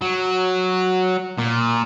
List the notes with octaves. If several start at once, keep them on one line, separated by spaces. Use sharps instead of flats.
F#3
A#2